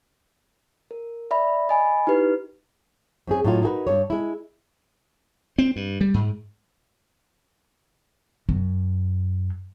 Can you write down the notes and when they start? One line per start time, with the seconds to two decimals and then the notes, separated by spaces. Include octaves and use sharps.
0.91 A#4
1.31 D5 E5 B5
1.69 D#5 G#5 B5
2.07 D#4 E4 G4 B4
3.27 F#2 C4 G#4
3.44 A2 F#3 D#4 F4
3.62 D#4 F4 F#4 G#4 A#4 B4
3.87 G2 C#5
4.10 G#3 E4
5.58 C4
5.76 G2
6.01 G3
6.14 G#2
8.49 F#2